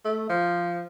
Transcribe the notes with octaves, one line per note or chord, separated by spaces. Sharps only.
A3
F3